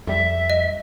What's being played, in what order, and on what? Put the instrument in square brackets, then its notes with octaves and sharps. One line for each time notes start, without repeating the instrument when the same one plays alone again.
[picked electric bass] F2 G3 [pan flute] E5
[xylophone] D#5